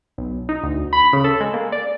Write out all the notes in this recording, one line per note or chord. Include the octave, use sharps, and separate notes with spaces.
B1
D#4
D2
B5
C#3
A4
G#3
A#3
D5